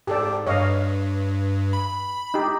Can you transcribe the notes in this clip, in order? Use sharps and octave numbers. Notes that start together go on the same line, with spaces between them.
G#2 G4 A4 D5
G2 C#5 D#5 F5
B5
D#4 G4